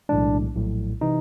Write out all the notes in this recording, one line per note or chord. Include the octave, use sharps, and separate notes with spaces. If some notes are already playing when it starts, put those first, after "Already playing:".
B1 A2 E3 G#3 D4
A#1 A2 F#3
C3 E3 D#4